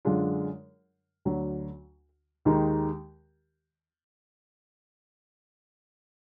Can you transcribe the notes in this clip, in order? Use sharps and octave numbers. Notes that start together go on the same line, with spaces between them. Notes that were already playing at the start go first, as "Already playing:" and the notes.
F#2 D3 G#3 D4 F4
D2 D3 F#3 D4
D#2 D#3 G#3 D#4